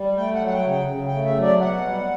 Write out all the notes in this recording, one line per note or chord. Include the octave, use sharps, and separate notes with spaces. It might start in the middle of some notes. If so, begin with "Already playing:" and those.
Already playing: G3
A3 G5
F#5
F#3
F#5
G5
C#3
G5
C#3
A3 G5
E5
F#3
D5
B2 F#5
G3